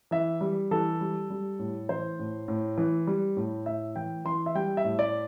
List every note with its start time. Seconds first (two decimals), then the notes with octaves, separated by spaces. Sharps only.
0.11 E3 E5
0.41 G3
0.71 E3 A4
1.01 G3
1.30 G3
1.59 A2
1.89 E3 C5
2.19 A2
2.48 A2
2.78 E3
3.07 G3
3.37 A2
3.66 A2 E5
3.96 E3 G5
4.25 E3 C6
4.46 E5
4.55 G3 G5
4.77 E5
4.84 A2
4.99 D5